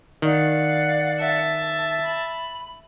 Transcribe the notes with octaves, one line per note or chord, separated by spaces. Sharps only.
D#3 D5 F5 F#5
E5 A5
B5